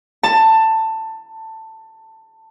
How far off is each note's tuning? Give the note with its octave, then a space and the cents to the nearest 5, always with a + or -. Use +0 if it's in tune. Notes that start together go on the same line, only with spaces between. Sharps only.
A5 +15